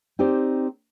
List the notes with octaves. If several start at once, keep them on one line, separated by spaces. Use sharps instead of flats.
C4 D#4 G4 C5 D5